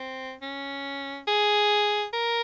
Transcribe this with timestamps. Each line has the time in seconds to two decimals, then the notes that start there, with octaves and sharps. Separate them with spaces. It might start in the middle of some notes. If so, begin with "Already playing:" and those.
Already playing: C4
0.42 C#4
1.27 G#4
2.13 A#4